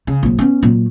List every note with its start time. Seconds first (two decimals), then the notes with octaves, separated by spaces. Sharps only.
0.07 C#3
0.23 A#1 F#3
0.39 B3 C#4
0.63 A#2 F#3